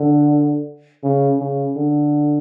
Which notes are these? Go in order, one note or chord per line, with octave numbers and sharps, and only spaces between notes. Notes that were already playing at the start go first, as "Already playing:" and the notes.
Already playing: D3
C#3
C#3
D3